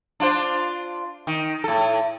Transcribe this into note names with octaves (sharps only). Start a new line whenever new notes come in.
D4 F4 C5
D#3
A2 A4